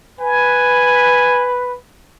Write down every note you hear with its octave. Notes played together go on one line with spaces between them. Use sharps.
B4 G#5